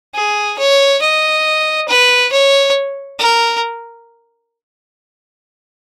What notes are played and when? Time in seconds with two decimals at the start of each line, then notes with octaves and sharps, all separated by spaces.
0.15 G#4
0.58 C#5
1.02 D#5
1.88 B4
2.33 C#5
3.19 A#4